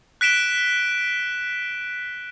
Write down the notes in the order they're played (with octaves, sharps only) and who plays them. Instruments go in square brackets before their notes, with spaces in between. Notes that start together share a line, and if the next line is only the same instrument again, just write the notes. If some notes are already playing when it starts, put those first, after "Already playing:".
[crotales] F#6 B6 D7 E7 G7